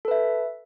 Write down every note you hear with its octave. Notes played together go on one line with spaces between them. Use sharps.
A4 B4 E5